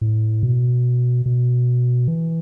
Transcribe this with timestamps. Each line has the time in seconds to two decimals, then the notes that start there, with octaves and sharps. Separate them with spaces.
0.01 A2
0.43 B2
1.26 B2
2.08 E3